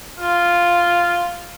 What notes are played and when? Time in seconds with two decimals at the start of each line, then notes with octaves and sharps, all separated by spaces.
0.20 F4